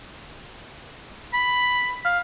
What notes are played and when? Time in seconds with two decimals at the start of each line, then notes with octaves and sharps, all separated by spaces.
1.33 B5
2.05 F5